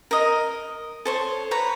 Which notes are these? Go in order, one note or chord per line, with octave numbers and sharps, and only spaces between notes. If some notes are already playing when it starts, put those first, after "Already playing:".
A#4 D#5
A4 C5 C#5
B4 C#5 A#5